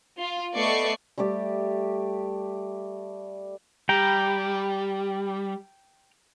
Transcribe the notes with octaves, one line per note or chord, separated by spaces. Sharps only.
F4
A3 B3 D5 D#5 C#6 C7
G3 A3 G4 D5
G3 G5 A#5